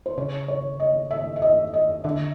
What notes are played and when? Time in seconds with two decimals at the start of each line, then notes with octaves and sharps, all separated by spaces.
0.06 C5
0.18 C#3 C#5
0.48 C#5
0.80 D#5
1.11 E5
1.36 E5
1.42 D#5
1.74 D#5
2.04 D3 E5